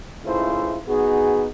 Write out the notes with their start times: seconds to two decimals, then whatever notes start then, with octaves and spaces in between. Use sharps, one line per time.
0.25 C#2 G#2 A3 E4 F4 C5
0.87 B3 D#4 F#4 G#4